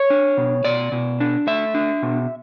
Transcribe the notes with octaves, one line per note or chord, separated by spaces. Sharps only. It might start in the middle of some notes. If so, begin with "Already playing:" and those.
Already playing: C#5
D4
B2
B2 D5
B2
D4
A3 E5
D4
B2